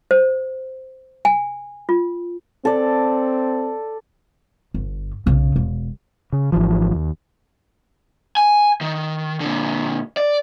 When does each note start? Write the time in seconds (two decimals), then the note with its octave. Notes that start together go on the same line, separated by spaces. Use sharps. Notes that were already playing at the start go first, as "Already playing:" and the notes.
0.11 C5
1.25 G#5
1.89 F4
2.65 C4 A4 D5
4.74 G1
5.26 B1 C#3
5.56 E1
6.33 C#3
6.52 G#1 E3 F3
6.94 D#2
8.37 G#5
8.81 D#3
9.40 A#2 D3
10.17 D5